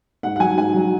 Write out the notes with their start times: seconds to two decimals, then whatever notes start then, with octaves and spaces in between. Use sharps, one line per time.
0.23 G#2 F#5
0.36 F#5
0.40 F#3 G#5
0.57 G#2 G#5
0.74 F#3